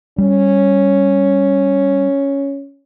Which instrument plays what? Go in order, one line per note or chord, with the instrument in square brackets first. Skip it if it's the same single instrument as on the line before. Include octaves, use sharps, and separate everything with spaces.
[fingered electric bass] G3 [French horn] C#4